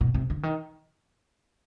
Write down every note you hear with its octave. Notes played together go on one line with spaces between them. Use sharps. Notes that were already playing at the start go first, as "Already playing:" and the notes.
B2
C3
D3
D#3